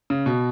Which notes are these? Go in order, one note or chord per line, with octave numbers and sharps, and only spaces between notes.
C#3
B2